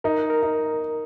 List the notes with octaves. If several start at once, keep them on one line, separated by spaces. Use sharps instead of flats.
D#4 A#4
A#4
D#4